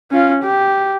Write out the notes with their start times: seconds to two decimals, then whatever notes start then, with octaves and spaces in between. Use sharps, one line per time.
0.11 C#4 F4
0.43 G4